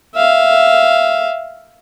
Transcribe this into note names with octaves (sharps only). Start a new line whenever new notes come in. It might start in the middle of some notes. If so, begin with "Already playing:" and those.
E5 F5